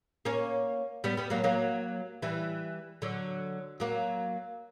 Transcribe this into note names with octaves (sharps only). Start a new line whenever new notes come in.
A#3 C#4
G3 B3
G3 B3
F#3 A#3
F#3 A#3
E3 G3
D3 F#3
F#3 A#3